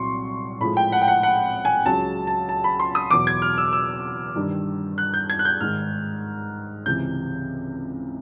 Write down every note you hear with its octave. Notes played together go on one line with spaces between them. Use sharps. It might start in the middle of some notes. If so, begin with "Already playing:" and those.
Already playing: C2 A#2 F#3 C6 C#6
A2 F3 G#3 B5
G5
F#5
G5
F#5
F#5
G#5
C#2 C#3 F#3 A5
A5
A5
B5
C6
D#6
E2 B2 F#3 D6
G#6
F6
E6
E6
G2 D#3 G3
F#6
G6
G#6
F#6
G6
G#2 D#3 G#3 F6
C#2 C3 E3 G6